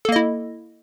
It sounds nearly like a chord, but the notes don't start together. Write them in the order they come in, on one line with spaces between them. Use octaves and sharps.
A4 A#3 D#5 E4